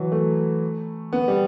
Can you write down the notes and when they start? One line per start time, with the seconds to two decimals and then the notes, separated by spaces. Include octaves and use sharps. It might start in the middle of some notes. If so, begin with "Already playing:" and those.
Already playing: E3 F#3
0.12 A3
1.13 B3
1.28 G3